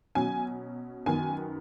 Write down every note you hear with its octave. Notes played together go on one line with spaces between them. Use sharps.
B2 F#3 C#4 G#5
F#2 D#3 B3 G#5